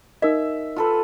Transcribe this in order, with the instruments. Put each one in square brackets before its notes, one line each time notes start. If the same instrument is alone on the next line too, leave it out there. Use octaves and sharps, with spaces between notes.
[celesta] D#4 A#4 D#5 [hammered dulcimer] E5
[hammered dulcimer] F4 A4 B4